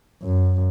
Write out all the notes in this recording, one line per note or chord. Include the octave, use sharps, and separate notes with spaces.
F#2